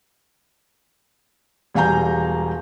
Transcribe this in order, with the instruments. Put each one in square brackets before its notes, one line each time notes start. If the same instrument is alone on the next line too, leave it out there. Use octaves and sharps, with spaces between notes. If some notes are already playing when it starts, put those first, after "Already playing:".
[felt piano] E1 G3 F5 G#5 A#5 G6